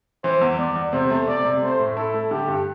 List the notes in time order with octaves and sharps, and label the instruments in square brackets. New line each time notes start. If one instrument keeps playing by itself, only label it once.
[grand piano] E3 [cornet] C5
[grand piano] E2
[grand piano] E2 [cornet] D5
[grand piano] E2
[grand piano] C3 [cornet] C5
[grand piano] A3
[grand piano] C3 [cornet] D5
[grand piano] C3
[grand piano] A3 [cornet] C5
[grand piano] A2
[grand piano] E4 [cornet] A4
[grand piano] A3
[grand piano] D3 [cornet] G4
[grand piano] G2